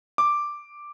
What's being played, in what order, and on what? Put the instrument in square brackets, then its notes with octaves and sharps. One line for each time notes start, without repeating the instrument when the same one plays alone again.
[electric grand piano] D6